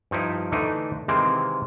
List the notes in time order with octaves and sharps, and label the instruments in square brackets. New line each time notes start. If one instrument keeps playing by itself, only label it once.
[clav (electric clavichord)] G2 F3 D#4 E4
D3 E3 A3 D4 D#4
C3 D#3 E3 G#3 A#3 C4